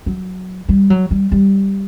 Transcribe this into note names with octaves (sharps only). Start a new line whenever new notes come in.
F#3
G3
F#3
G3
G3